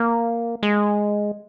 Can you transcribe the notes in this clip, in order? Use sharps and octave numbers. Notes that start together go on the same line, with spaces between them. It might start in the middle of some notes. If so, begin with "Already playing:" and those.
Already playing: A#3
G#3